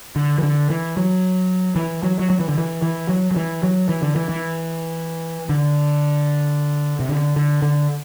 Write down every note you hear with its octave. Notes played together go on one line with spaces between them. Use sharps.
D3
E3
D3
E3
F#3
E3
F#3
F#3
F#3
E3
D3
E3
E3
F#3
F#3
E3
F#3
E3
D3
E3
E3
D3
C3
D3
D3
D3